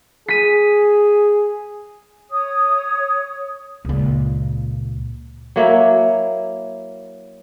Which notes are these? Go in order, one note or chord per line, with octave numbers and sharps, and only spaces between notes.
G#4 B6 D#7
C#5 D#6
C#2 A#2
F#3 A#3 E4